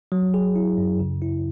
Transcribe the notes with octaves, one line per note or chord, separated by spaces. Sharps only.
F#3
G#4
E4
F#2
C#3
E4